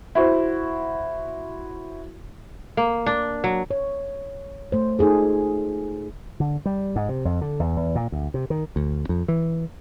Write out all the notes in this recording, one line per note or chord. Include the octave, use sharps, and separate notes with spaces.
E4 F#4 C5
A#3
D4
F#3
C#5
A3 C5
D#4 F4 G#4 A4
D3
G3
G#2
C3
F2
D3
E2
E2
A#2
D2
C3
D#3
D2
F2
E3